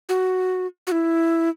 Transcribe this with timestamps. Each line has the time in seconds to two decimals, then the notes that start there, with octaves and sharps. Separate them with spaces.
0.09 F#4
0.87 F#4
0.92 E4